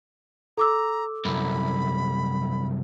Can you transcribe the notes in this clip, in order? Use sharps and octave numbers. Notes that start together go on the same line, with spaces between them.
A4 A#5 D6 E6
C2 F#2 B5